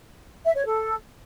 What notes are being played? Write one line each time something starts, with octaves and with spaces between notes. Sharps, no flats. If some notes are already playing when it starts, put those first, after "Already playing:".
E5
C#5
A4